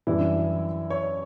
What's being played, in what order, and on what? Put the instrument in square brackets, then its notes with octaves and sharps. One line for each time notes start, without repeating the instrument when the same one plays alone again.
[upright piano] F#2 E3 G3 D4 [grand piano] E4
[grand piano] C#5